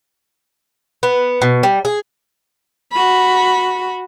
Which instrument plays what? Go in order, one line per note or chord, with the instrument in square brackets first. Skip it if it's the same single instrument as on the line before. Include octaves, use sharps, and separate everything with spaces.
[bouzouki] B3
B2
G3
G#4
[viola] F#4 B5